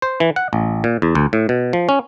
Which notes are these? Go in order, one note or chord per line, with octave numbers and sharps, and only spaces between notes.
C5
E3
F#5
A1
A#2
E2
D2
A2
B2
F3
C#4